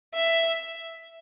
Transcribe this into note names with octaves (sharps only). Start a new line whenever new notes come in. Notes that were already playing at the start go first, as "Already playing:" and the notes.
E5